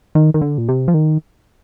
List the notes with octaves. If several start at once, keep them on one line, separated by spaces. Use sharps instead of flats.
D#3
D#3
D3
A#2
C3
F3
D#3